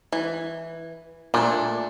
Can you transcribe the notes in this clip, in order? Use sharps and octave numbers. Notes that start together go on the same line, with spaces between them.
E3
A#2 A3 D4